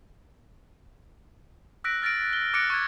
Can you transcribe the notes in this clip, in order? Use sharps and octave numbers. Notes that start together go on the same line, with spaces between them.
E6 F#6 A#6 B6 D7
F6 A6 A#6 D7
G7
D6 F#6 A6 A#6 C#7 D7
C#6 F#6 G#6